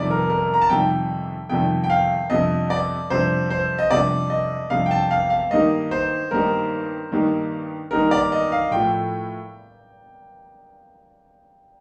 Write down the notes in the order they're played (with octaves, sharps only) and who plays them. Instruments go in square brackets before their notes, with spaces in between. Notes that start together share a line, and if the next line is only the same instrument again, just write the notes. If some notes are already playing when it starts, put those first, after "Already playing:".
Already playing: [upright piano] F2 C3 D#3 G3 [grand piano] D5
[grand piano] A#4
A#4
A#5
A5
[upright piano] F2 C3 D#3 G3 [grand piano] G5
[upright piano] F2 C3 D#3 G3 [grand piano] G5
[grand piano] G5
F5
[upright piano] F2 C3 G3 D4 [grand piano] D#5
[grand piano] D5
[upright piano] F2 C3 G3 D4 [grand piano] C5
[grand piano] C5
D#5
[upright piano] F2 C3 G3 D4 [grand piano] D5
[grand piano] D#5
[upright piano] F2 C3 G3 D4 [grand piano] F5
[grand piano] G5
A5
F5
F5
[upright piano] G2 D#3 A#3 D#4 G4 [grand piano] D#5
[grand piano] C5
[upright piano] G2 D#3 A#3 D#4 G4 [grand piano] A#4
[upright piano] G2 D#3 A#3 D#4 G4
[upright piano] G2 D#3 A#3 D#4 G4 [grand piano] A#4
[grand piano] D5
D#5
F5
[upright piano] A2 F3 A3 [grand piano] G5